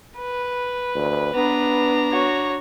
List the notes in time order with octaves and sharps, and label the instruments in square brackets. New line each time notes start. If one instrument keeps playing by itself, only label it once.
[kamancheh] B4
[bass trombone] D2
[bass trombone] B3 [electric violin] D4 A#5
[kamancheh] F#4 C#5